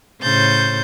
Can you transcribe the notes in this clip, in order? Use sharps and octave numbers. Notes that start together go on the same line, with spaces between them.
A2 C#3 C5 G6 A6